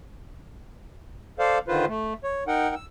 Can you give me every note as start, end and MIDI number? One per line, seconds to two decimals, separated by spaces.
1.39 1.58 69
1.39 1.58 72
1.39 1.58 74
1.39 1.58 77
1.68 1.85 50
1.68 1.85 51
1.68 1.85 65
1.68 1.85 71
1.68 1.85 72
1.88 2.13 57
2.24 2.44 73
2.47 2.75 63
2.47 2.75 70
2.47 2.75 78
2.47 2.75 79
2.75 2.85 88